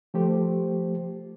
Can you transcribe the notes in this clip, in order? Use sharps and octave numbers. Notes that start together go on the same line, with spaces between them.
F3 A3 G4 C5